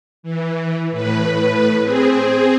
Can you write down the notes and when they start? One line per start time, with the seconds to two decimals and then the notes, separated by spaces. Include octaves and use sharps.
0.23 E3
0.91 A2 B4
1.83 C4 G#4